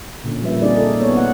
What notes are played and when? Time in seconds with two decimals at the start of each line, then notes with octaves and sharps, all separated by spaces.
0.24 A#2 D3 C#4
0.41 F3 G3 A#3 F4 B4 E5
0.61 C4 D4 D#4 G#4 D5 D#5
0.76 A4
1.01 B3 C4 C#5
1.16 C5 F#5